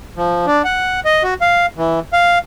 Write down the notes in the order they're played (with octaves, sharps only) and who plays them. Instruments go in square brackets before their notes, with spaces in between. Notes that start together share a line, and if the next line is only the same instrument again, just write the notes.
[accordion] F3
D4
F#5
D#5
F#4
F5
E3
F5